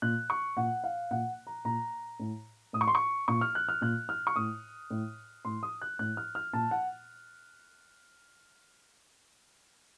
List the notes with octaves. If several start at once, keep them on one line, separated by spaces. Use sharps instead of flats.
A#2 F#6
C#6
A#2 F#5
F5
A#2 F#5
A#5
A#2 A#5
A2
A2 D#6
C#6
C6
C#6
A#2 C#6
F6
F#6
F6
A#2 F#6
F6
C#6
A2 D#6
A2
A2 C6
D#6
F#6
A2 F#6
F6
F6
A#2 A5
F#5